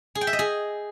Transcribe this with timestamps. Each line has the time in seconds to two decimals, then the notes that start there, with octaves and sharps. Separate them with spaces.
0.15 G#4
0.21 G5
0.27 E5
0.33 D#5
0.39 G#4